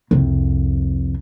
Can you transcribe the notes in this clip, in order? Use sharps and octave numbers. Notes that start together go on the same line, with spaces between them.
C2 F2